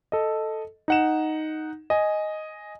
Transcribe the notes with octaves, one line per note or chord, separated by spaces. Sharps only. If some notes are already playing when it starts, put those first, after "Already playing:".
A4 D#5
D#4 F#5 E7
D#5 G#5